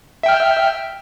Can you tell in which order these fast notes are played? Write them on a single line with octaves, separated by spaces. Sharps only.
E5 G5 F6